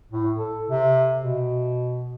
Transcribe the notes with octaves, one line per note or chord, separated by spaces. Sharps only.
A2
A4
C3
B2